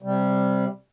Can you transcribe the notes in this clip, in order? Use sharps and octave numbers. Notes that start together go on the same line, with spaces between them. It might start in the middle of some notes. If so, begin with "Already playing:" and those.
C3 G3